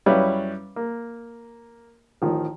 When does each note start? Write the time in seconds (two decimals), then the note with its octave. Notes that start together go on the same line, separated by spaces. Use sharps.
0.06 F#2 G3 C#4 E4 B4 F5
0.76 A#3
2.22 A1 D#3 F3